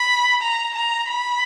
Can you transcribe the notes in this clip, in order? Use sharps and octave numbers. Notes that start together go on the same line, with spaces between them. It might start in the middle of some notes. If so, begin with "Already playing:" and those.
Already playing: B5
A#5
A#5
B5